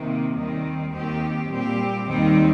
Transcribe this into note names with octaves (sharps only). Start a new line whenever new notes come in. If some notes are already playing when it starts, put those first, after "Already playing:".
Already playing: C3 D#3 A#3
D#2 D#3 G3 C4
D#2 D#3 C4 G4
A#2 G3 C4 G4
D#2 D#3 G3 C4 D#4